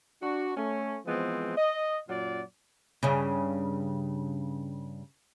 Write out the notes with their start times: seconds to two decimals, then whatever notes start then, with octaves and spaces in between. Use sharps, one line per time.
0.21 D4 F#4
0.56 A3 C#4
1.06 E3 F3 G#3 B3 C4
1.57 D#5
2.09 F#2 A#2 F#3 F4 D5
3.03 G2 C#3